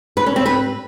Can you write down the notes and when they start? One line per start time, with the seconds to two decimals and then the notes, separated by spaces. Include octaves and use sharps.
0.17 B4
0.26 C#4
0.36 C4
0.46 B4